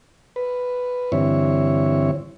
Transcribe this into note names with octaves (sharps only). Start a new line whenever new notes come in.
B4
G2 D3 E3 C4 E4 C#5